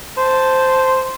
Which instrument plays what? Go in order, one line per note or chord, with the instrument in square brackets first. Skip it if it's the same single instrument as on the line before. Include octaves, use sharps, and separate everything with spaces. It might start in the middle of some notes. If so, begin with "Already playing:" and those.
[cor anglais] C5 [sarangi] A5